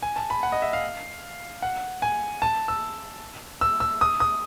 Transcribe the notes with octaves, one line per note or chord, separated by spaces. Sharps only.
G#5
A5
B5
F#5
D#5
E5
F5
F#5
G#5
A5
E6
E6
E6
D#6
D#6